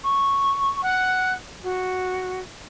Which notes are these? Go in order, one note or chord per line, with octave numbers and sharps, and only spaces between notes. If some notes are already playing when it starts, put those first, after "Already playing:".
C#6
F#5 F#6
F#4